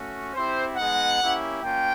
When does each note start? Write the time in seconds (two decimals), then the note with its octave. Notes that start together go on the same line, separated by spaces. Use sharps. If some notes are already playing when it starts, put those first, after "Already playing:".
Already playing: A3 C#4 F#4
0.34 C4 E4 G4 C5
0.77 G#3 B3 D#4 F#5
1.19 A#3 C#4 E4 G4
1.62 A#3 C#4 F4 G5